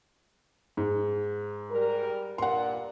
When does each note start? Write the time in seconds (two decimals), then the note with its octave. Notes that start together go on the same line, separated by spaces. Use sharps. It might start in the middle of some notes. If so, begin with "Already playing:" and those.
0.77 G#2
1.71 G3 A#4
2.38 G2 A#2 F#5 C6